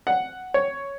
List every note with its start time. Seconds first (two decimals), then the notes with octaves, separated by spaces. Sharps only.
0.07 F#5
0.54 C#5